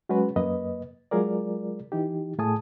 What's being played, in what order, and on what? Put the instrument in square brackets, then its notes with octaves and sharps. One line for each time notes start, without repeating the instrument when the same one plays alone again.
[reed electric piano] F#3 G#3 C#4 F#4 G#4 B4
F#2 A#3 B4 D#5
F#3 G#3 F4 G#4 A#4 D5
E3 D#4 G4
A2 A3 G#4 G#5 A5 D#6